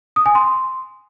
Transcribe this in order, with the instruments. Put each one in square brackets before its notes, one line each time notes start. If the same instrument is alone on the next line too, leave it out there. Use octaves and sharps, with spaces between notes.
[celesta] D#6
G#5
C6